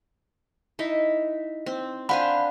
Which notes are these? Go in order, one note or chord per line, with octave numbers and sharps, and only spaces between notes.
D#4 E4
C4
D4 C5 F5 F#5 G#5 B5